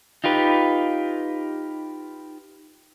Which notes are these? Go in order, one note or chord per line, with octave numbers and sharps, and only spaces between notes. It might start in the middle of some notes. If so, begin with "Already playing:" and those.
D#4 F4 G4 B4